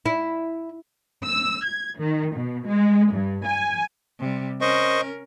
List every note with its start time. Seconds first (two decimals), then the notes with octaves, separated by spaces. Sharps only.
0.06 E4
1.25 E6
1.65 G#6
1.99 D#3
2.36 B2
2.68 G#3
3.14 G2
3.47 G#5
4.20 C3 G3
4.61 C#4 A#4 C5 D#5 C#6